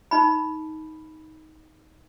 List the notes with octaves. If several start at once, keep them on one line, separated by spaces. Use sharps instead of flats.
D#4 B5